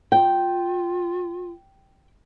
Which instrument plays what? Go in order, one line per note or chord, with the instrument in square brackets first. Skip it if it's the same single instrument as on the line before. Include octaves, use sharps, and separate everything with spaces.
[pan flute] F4 [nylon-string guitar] G5